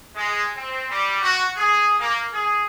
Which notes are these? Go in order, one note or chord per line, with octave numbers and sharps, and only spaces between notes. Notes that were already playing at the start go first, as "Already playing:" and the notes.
G#3
C4
G3
F#4
G#4
A#3
G#4